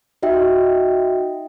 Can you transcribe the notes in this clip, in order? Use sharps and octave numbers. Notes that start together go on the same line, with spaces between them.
D#4 F#4 D#5 E5 G5